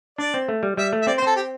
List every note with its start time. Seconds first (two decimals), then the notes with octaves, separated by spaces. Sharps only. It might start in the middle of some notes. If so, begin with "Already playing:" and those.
0.18 D4 D5
0.34 C4
0.48 A3
0.63 G3
0.77 G3 E5
0.93 A3
1.02 E5
1.07 C4 D5
1.18 C5
1.22 C4 A4
1.36 G4